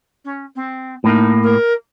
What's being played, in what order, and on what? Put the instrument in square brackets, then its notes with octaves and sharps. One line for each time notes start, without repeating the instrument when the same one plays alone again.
[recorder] C#4
C4
[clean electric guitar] A2 A#3 [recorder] D#4
[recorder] A#4